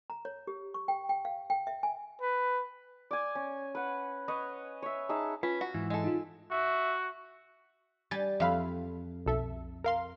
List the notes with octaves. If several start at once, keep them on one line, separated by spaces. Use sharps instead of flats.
A#5
C#5
G4
C#6
G5
G5
F5
G5
E5
G#5
B4
D5 G#5
C#4
B4 F#5
B4 C#5 D#5
C#5 E5
D#4 G#4 E5 A5
C#4 F4 B4
F#4
G#2 E3 E4
G#3 A4
D#4 F4
F#4 E5
G3 G5 G#5 A6
F2 E5 F5 B5
B1 A4 E5
A#4 F5 C6